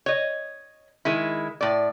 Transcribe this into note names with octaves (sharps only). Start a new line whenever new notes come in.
C#5 D#5
D#3 G#3 E4
A2 D5